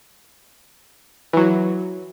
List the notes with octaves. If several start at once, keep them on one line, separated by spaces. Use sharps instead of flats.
E3 F#3